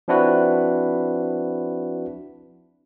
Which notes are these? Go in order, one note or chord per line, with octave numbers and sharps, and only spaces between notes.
F3 C4 D4 E4 F#4 B4